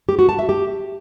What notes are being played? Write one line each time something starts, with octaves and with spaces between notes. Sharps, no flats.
G4
F#4
A5
E5
G4